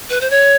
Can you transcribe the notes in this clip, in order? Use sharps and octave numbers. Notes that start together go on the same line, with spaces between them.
B4
C5
C#5